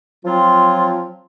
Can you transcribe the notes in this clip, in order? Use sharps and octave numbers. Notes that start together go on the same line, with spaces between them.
F3 F#3 C4 F4